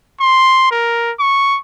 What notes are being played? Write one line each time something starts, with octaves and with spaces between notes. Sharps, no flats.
C6
A#4
C#6